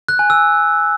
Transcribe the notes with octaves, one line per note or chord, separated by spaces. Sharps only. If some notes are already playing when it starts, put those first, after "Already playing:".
F#6
G#5
E6